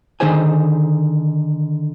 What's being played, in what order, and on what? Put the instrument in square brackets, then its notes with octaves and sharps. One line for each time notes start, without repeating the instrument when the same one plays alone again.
[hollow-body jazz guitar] D3 D#3 D#4 G#4 C5 G#5